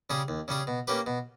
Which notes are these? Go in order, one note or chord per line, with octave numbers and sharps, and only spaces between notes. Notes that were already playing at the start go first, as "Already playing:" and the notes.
C#3 G3 C#4 G#4
D#2
C#3 G3 C#4 G#4
B2
A#3 C#4 G4 B4
B2